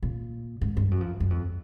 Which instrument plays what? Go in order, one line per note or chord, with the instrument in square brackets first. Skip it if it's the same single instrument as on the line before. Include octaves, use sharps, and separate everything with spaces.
[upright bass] A#2
G#2
G2
F#2
F2
F#2
F2